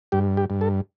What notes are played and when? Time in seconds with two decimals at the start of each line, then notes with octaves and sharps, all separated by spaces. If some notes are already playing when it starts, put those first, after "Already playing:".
0.12 G2 G4
0.37 G4
0.50 G2
0.61 A4